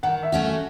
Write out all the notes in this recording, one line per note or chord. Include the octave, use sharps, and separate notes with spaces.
D#3 F#5
E5
A3 C#4 F#4